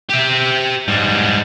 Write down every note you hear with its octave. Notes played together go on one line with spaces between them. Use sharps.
G4 E5
G#2 G3